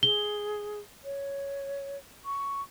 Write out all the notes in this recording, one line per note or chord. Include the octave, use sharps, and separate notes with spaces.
G#4 G7
C#5
C#6